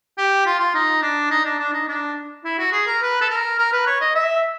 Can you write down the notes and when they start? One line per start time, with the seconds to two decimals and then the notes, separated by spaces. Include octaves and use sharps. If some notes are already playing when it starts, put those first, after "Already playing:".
0.18 G4
0.46 F4
0.60 F4
0.74 D#4
1.02 D4
1.31 D#4
1.45 D4
1.59 D4
1.73 D#4
1.88 D4
2.45 E4
2.59 F#4
2.73 G#4
2.87 A#4
3.02 B4
3.21 A4
3.30 A#4
3.59 A#4
3.72 B4
3.87 C#5
4.01 D#5
4.15 E5